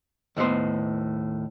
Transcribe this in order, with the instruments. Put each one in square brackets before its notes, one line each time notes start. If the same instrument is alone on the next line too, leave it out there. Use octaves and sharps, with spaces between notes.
[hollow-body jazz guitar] D#2 A2 B3 C5